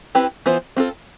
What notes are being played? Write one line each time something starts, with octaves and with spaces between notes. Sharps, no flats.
C4 E4 G4 B4
E3 B3 F4 C5
C4 F4 A4